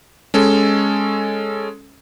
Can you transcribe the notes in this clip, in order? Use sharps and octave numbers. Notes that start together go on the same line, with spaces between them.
G#3 C#4 A4